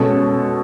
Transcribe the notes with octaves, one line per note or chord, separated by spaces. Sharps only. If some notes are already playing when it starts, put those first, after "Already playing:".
Already playing: B2 G#3 C#4 A4